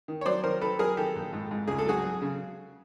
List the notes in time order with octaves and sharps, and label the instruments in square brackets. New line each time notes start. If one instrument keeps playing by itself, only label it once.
[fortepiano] D#3
C#5
F#3 C5 D5
D#3 A#4 C5
D#3 A4 B4
F#3 G#4 A#4
D#3 G4 A4
A#1
G#2
G#2
C#2 G#4
A4
F#3 F#4 G#4
F#3
C#3